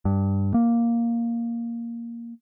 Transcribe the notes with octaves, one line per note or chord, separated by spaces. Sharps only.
G2
A#3